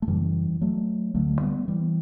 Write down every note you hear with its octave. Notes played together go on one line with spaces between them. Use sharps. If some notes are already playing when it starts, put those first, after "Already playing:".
A3
F#2 C#3 E3 G3
F#3 A3
D2 D3 F#3 A3
G3 B3
E3 G3